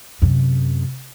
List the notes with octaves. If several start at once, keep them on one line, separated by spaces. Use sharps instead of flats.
F#2 C3